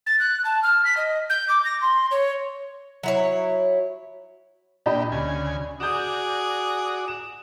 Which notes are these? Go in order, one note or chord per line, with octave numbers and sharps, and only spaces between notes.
A6
F#6
A5
F6
B6
D#5
G6
D6
A#6
C6
C#5
F#3 E4 C#5
A#2 D4 G4 D#5 B5
D2 C#3 G#5
F#4 G#4 D5 D#6 G6 E7
E7